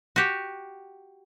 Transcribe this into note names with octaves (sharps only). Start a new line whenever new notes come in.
F#4 G4